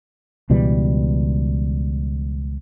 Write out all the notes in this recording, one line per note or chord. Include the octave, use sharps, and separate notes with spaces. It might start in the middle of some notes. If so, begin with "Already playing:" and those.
C#2 B2 E3 G3